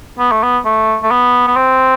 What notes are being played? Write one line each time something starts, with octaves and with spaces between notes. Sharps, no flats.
B3
A3
B3
A3
A3
B3
B3
C4